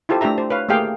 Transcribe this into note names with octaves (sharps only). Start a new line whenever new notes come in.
E4 F4 G4 A4 C5
A3 D4 G4 E5 A#5
C5
B4 C#5 F5
A3 A#3 G4 G#4 F5 G5